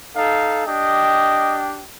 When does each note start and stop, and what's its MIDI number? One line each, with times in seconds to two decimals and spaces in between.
0.16 0.66 63
0.16 0.66 69
0.16 0.66 77
0.67 1.83 62
0.67 1.83 67
0.67 1.59 75
0.67 1.83 79